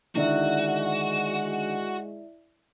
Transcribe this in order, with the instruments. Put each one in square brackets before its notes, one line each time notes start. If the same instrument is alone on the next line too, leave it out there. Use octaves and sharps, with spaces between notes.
[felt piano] D3 D#3 [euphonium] G#3 [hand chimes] E4 D5 E5 [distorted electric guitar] F#4